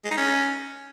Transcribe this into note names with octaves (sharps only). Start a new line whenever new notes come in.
G#3
D#4
C#4